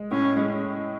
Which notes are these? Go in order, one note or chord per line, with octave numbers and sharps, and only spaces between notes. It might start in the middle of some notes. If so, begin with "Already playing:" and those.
Already playing: G#3
A2 C#4
G#3